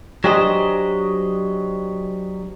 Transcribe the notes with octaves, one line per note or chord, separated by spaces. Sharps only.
F#3 D4 G4 G#4 C5 D#5